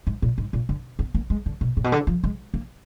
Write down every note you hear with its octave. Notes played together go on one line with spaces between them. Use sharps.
G#2
A#2
G#2
A#2
D3
B3
A#3
G#3
D3
B2
A#2
B2
D3
F3
G#3
A#3